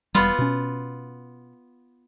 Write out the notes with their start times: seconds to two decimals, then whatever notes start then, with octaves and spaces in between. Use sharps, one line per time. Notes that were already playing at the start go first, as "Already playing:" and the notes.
0.15 E1 G3 B3 F4
0.39 B2 C#4